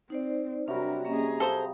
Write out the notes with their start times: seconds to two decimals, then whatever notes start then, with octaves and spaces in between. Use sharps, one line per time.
0.10 C4 D#4 C5 D5
0.68 C3 F#3 G3 D4 F#4 A#4
1.05 A#3 C#4 G#4 D#5 A#5
1.40 A4 C5 F5 D#6